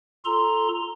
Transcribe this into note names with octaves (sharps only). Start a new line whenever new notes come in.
F4 A4 A#5 C6